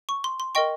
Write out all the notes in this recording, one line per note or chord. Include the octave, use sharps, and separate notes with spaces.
C#6
C6
C6
A#4 D#5 G5 C#6